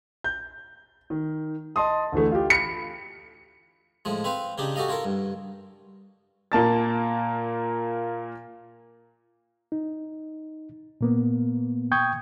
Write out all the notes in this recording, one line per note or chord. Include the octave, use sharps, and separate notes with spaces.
G6
D#3
D#5 A5 C6 D#6
D2 E3 A3
F4 G4
B5 C#7
A2 F3 G#3
C4 B4 C5 F5
C#3 D4 D#4 G4
F#4 G4 A4 D#5 F5
E4 F4 A4 A#4
G2
A#2 A#3 A5 A6
D#4
A#2 A#3 B3
G5 C#6 D#6 G6 G#6